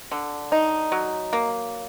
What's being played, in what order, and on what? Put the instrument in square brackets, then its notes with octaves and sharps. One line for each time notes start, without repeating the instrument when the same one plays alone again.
[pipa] D3
D#4
F#3
A#3